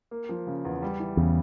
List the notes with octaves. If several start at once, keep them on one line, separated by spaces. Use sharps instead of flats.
A#3
F3
C#3
E2
G3
E3
E2 C#3